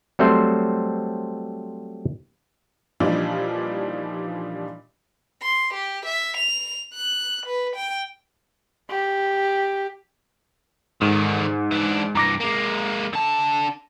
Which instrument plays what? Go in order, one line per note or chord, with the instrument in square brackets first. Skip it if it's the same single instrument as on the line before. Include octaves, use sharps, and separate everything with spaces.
[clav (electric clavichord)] F#3 G3 A3 C4 A4 C5
[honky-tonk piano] A#2 E3 F3 G3 D4 D#4
[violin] C6
G4
E5
F7
F#6
B4
G5
[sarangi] G4
[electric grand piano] G#2 [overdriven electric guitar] D3 D#3
[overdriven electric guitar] E3 D4
[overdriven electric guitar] G2 E3 [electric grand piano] A#5 D6 A#6
[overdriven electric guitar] G#3 A#3
D3 A5